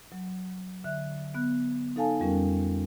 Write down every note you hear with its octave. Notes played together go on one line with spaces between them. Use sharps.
F#3
D3 E5 F#6
B3 F#6
D#4 A4 F5 G#5 A5
F2 G3 C#4 A#4